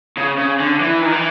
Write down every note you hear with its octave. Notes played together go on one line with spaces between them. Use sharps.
C#3
C#3
D3
E3
D#3
E3